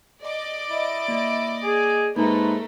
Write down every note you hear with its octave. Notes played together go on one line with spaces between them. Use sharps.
D5 D#5 D6
E4
A#3 E4
G#4
G#2 A3 A#3 A#4 B4